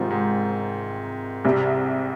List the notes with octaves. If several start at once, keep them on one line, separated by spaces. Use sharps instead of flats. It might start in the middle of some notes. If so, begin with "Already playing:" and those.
Already playing: G#2 C3 D#3 G3 C4 F4
G#2
C2 C3 G3